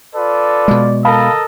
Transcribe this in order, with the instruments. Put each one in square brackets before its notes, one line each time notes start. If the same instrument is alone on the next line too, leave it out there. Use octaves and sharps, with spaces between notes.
[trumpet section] F4 A4 B4 [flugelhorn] D5
[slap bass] B2 G#3
[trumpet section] A4 A#4 D#5 [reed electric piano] F5 A5 B5